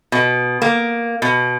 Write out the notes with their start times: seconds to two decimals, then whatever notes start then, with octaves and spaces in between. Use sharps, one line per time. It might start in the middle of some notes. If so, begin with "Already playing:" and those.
0.12 B2
0.62 A#3
1.22 B2